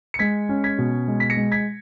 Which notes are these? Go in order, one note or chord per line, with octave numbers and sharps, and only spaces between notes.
C#7
G#3 G#6 B6
C#4
G#6 B6
B2
G#3
B6
A#6 C#7
G#3
G#6 B6